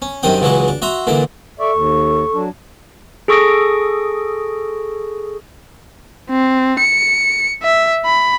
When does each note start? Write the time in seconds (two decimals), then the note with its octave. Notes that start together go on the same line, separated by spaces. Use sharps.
0.02 C#4
0.23 F#2 C3 D#3 D4 G5 D#6
0.41 C#2 C#3 E3 F#3 G#3 C#6
0.68 D4
0.82 F#4 E5 A#5 C6
1.07 A#2 D3 E3 A5
1.59 A4 D5 E5 C#6
1.73 D#2
2.34 F#3 D4
3.28 G#4 A4 C#6 D#6 A#6 D7
6.30 C4
6.79 C#7
7.63 E5
8.05 B5